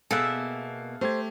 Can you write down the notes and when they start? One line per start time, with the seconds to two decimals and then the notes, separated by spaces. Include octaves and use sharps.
0.11 B2 A#3 G#4 A4 E5 F5 F#6
1.01 A3 G4 C5 G#6